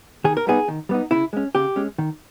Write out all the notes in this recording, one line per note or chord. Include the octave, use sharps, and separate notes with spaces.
D#3 G#4
A#4
G3 B3 D#4 G#4
D#3
G3 B3 D#4
C#3 E4
G#3 C#4
C#3 G4
G#3 C#4
D#3